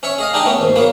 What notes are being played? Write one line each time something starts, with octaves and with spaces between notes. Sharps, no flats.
C#4 C#5 E5 C#6
G#4 D#5 F5
D4 D#4 G4 G#4 D#5 D6
A3 B3 C#4
D#2 G#2
F#3 A#3 B3